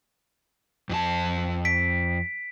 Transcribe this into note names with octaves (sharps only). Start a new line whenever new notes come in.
F2 E4 A5
B6 D7